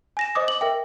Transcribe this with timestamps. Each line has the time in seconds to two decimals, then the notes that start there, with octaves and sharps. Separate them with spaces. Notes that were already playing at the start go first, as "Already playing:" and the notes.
0.17 G#5 A#6 E7
0.35 C5 D#5 D6 D#6
0.48 D6 F#7
0.61 A#4 E5 G5